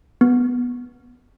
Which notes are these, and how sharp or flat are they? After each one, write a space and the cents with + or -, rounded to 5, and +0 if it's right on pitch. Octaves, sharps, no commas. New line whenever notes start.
B3 -10